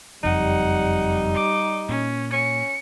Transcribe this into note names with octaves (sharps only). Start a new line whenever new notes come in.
F#1 F2 G3 D#4 F#5
D6
A#2 C#4
C#4 C#7